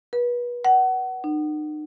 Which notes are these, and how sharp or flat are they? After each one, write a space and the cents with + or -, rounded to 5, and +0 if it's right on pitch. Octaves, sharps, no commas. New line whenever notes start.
B4 -30
F#5 +25
D#4 -40